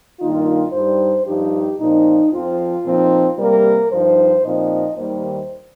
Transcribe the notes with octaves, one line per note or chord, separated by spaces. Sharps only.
G2 D#3 A#3 D#4 F4
G2 G3 D#4 C5
G2 F3 D#4 G4
A#2 F3 C4 D#4
F2 F3 C4 F4
A#2 F3 C4 D#4
C3 G3 A#3 A#4
G2 F3 D#4 C5
A#2 F3 C4 D#4 D#5
D#2 D#3 G3 A#3 C5